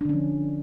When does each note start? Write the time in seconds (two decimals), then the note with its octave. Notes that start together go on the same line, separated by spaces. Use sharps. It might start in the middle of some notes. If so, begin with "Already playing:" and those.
0.01 D4
0.05 D3
0.09 C#4
0.13 F3